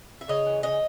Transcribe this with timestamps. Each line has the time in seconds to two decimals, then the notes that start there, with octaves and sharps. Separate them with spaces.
0.21 E5
0.28 C#3 C#5 D#5
0.46 E3
0.63 C#3 C#5 D#5